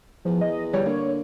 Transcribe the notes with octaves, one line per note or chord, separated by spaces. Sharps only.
E2 F3
D#5
G3 C#5
D3 A#3